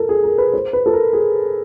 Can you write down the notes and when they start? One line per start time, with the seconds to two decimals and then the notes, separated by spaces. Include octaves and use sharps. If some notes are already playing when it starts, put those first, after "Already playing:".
Already playing: A4 A#4
0.09 G#4
0.24 A#4
0.38 B4
0.54 C5
0.73 B4
0.86 A4
0.93 A#4
1.13 G#4